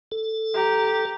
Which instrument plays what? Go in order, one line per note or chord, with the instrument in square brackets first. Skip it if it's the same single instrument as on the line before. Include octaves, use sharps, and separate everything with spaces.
[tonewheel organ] A4
[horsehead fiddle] G4 A#5